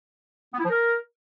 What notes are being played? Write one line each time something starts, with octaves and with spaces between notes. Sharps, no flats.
B3
E4
F3
A#4